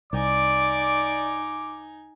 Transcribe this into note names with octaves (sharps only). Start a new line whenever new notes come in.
C2 D#4 D5 G#5 D6